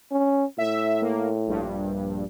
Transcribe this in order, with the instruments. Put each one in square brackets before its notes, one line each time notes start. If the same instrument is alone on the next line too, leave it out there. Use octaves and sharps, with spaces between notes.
[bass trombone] C#4
[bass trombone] A2 [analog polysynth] E5
[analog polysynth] A#3
A#1 G2